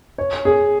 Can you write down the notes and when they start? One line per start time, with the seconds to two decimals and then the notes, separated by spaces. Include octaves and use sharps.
0.18 C#5
0.45 G#4